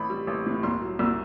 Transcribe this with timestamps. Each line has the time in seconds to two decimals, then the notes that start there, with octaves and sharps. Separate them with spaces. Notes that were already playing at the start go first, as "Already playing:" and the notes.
Already playing: A1 B5
0.10 G3
0.27 A1
0.46 A2
0.63 C2 C6
0.82 F#3
0.99 C2 E6